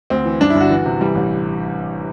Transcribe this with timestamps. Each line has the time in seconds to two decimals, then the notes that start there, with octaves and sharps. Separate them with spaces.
0.10 D2 C4
0.25 E3
0.41 G2 D4
0.50 E4
0.56 G1 F#4
0.70 E3
0.85 C3
1.01 E3 G3
1.15 A1